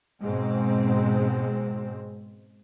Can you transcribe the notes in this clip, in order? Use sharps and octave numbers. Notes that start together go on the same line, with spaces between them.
G#2 B2 G#3 C4